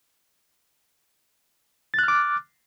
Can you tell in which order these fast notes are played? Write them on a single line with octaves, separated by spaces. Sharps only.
A6 F#6 F6 D6